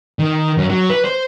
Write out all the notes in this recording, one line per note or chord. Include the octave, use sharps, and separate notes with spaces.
D#3
F#2
F#3
B4
C5